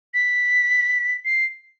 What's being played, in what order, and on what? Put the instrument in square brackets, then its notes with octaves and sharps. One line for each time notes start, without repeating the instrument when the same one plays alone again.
[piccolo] B6
C7